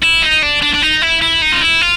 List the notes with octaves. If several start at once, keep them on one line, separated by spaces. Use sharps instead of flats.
E4
D#4
D4
D4
D4
D#4
E4
E4
D#4
F4
E4
F4